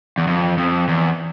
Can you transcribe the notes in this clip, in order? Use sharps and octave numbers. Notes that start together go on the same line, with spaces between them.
E2
F2
F2
E2